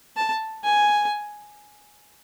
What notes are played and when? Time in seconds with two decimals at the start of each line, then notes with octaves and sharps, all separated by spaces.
0.17 A5
0.64 G#5